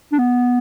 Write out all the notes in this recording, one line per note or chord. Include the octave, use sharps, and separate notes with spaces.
D4
B3